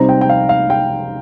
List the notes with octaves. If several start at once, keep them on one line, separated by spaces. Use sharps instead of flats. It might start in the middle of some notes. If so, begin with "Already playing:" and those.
Already playing: C3 G3 C4 D#4 A#5
G5
G5
F5
F5
G5